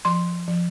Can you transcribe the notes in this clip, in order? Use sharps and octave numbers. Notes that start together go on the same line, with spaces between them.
F3 C6
F3